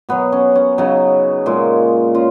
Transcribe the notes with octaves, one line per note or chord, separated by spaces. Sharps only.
B2 F#3 B3
C#4
C#4
C#3 F#3 D#4
A#2 G#3
C#3 F4